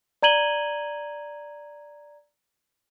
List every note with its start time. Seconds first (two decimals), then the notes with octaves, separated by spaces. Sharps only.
0.22 D5 A#5 G#6 D#7 F#7 G7